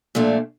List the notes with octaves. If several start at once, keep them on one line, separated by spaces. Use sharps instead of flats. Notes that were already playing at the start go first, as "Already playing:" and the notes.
A#2 F3 A3 D4